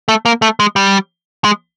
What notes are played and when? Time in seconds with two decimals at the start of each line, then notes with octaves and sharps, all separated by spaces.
0.08 A3
0.26 A#3
0.42 A3
0.60 G#3
0.76 G3
1.45 G#3